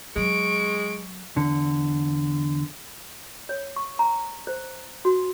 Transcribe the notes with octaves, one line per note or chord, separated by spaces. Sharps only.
F#3 G#3 C#6 D7
E2 D3
C#5
C#6
A#5
C5
F#4